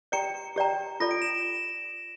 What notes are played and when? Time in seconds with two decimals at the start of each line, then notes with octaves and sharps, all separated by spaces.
0.12 G4 D5 G5 A#5 C#7
0.56 G4 D5 G5 A#5
1.00 F4 A4 D5 A#6
1.11 D7
1.22 E7